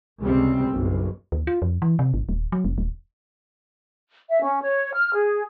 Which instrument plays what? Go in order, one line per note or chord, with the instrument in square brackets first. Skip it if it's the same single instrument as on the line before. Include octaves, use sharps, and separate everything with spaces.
[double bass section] C#2 C3 G3 C4
F#1 B1
[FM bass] D#2
F4
F2
E3
C3
G#1
D#1
F#3
F1
D#1
[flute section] E5
C#4
C#5
F6
G#4